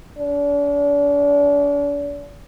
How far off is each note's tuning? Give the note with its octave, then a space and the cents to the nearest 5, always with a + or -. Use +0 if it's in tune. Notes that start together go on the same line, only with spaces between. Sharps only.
D4 -40